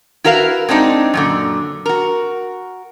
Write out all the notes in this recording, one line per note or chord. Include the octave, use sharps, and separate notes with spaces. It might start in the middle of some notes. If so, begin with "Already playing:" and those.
E4 F#4 A#4 B4 F5
G#3 C4 D4 D#4
F#2 A#2 D3
F#4 A#4